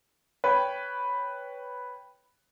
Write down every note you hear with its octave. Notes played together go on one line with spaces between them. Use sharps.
B4 C#5 G5